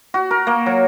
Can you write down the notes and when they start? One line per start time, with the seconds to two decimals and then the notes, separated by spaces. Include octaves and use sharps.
0.14 F#4
0.31 A#4
0.47 A#3
0.66 F#3